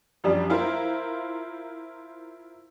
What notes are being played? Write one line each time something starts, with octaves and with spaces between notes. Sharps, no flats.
F#2 F3 G3 D4
E4 F4 A#4 C5